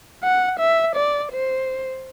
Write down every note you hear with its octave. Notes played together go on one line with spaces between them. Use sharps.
F#5
E5
D5
C5